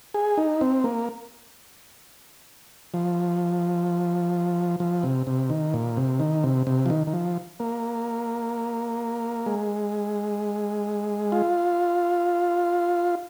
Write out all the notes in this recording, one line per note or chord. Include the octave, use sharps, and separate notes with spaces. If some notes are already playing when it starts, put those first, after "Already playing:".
G#4
D#4
C4
A#3
F3
F3
C3
C3
D#3
A#2
C3
D#3
C3
C3
F3
D#3
D#3
F3
A#3
G#3
F4